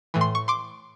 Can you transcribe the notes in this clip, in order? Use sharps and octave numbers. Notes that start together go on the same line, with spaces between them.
A2 E3
C6
C#6
C6 D6